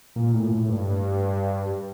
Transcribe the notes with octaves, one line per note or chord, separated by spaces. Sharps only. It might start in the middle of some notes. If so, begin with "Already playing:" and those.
A#2
A2
A2
G2